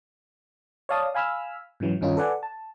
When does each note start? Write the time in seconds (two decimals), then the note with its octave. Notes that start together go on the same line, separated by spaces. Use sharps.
0.89 C#5 D5 F5 A5 D#6
1.15 F5 G#5 B5 E6 F6
1.80 G#2 C#3 E3 F#3
2.01 G2 D#3 C#4 D#4 F4
2.17 A4 B4 D5 F#5 G#5
2.43 A5